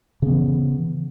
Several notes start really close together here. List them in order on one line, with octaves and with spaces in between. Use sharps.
C#3 B3 E3